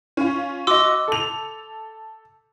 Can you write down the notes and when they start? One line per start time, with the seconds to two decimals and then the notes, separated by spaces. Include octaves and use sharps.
0.17 C#4 F4
0.67 F#4 D#5 C6 D6 E6
1.08 A4 F7